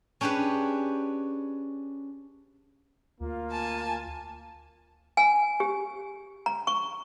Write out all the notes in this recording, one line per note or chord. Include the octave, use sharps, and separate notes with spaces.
C#4 D4 G4 G#4 B4
D2 A#3 F4
G#5 A5
G#5
G4
A#5
C#6